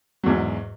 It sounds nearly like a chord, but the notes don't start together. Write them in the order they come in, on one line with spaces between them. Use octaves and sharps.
F#3 E2 G#2